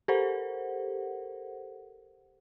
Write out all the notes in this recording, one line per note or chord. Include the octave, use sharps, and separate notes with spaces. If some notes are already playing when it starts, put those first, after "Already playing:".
G4 A4 A#4 C5 F#5